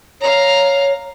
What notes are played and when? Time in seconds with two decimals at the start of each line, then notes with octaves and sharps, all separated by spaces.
0.21 C#5 F5 A#5